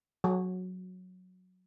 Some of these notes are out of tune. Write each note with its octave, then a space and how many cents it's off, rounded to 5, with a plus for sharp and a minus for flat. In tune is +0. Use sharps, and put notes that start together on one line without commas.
F#3 -10